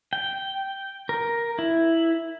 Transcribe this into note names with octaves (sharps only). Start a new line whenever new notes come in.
G5
A#4
E4